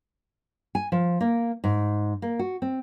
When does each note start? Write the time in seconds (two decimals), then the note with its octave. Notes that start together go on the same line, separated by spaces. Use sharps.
0.75 G#5
0.92 F3
1.21 A#3
1.64 G#2
2.22 A#3
2.39 F#4
2.62 C4